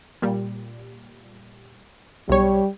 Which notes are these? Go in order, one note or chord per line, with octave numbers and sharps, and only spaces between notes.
A#2 G3
B1 G3 C#5